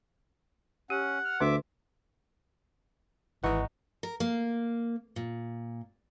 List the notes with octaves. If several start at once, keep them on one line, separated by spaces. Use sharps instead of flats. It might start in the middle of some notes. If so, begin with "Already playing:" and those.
C#4 G4 F#5
F6
D2 D3 E5 D6
G#1 E3 G#3 D#4 F#5 C#6
A#4
A#3
A#2